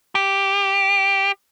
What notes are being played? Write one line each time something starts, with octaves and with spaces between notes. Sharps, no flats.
G4